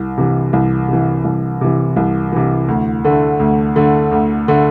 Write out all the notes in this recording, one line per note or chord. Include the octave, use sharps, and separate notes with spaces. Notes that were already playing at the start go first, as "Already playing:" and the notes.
Already playing: C2
C3 E3
C2
C3 E3
C2
C3 E3
C2
C3 E3
D2
D3 A3
D2
D3 A3
D2
D3 A3